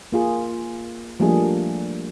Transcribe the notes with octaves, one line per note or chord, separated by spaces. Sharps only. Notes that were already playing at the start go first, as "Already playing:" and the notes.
A#3 F4 G#4
F3 G3 A3 A#3 D4 G#4